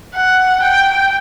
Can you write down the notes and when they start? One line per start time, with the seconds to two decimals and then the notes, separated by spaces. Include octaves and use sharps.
0.14 F#5
0.63 G5